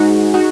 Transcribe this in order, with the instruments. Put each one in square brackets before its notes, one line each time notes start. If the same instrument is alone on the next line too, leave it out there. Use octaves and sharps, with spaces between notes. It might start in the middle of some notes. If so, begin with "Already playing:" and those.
Already playing: [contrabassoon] G#2 [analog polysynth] D#4 F#4 G#4
[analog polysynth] D#4 F#4